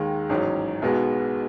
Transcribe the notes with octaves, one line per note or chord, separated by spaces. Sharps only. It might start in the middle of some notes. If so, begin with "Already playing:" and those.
Already playing: D#2 D#3 G#3
A1 G#2 F#3 C#4
B1 B2 G#3 B3 F#4